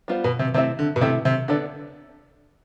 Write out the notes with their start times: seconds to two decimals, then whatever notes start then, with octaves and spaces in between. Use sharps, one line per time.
0.08 G3 B3 F4 C5
0.24 B2
0.39 C3
0.54 C3 A3 C4 E4 A4 E5
0.79 D3
0.96 B2
1.01 C3 A3 C4 E4 A4 E5
1.25 C3
1.48 D3 B3 D4 A4 D5